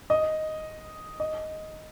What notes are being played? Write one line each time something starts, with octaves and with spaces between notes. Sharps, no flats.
D#5
D#5